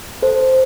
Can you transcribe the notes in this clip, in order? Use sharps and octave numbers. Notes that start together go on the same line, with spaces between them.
A4 C5